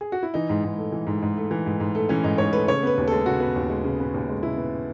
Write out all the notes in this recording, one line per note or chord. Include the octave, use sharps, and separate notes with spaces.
G#4
F#4
E4
E3 D#4
G#2
G#2
A3
E3
G#2
G#2
A3
E3
G#2
G#2
A3
E3 C#4
G#2 D#4
G#2 C#5
A3 B4
C#3 C#5
B3 B4
D#2
G#3 A4
C#3 F#4
B3
D#2
G#3
C#3
B3
D#2
G#3
C#3 E4
B3